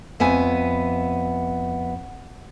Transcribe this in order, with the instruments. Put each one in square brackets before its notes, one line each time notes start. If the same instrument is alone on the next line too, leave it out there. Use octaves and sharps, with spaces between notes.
[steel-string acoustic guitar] F2 B3 E5 G#5